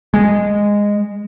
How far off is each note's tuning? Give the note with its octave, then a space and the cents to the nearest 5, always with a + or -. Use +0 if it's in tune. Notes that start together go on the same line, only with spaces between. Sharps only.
G#3 -10